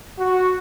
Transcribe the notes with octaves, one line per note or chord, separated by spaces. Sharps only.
F#4